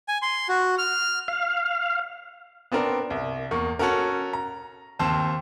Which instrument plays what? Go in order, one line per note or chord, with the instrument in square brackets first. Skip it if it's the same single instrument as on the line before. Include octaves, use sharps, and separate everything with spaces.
[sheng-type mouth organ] G#5
C6
F#4
F6
[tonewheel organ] F5
[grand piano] B3 C4 D4 A#4
C2
E2 A#3 C#6
C#4 F#4 A4 A#4
A#5
D#2 C4 C5 A5